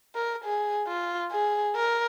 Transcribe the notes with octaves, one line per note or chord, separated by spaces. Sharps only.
A#4
G#4
F4
G#4
A#4